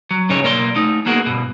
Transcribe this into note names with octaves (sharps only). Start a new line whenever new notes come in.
F#3
G2 C#3 D#4 G#4 C#5
B1 A#3 A#4 D5 F5 C6
A3 D#4
A#3 B3 F#4 G#4 A#4
G2 B2